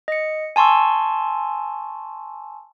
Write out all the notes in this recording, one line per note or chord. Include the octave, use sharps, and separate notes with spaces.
D#5 C#7
G#5 A5 C6 C#6 E6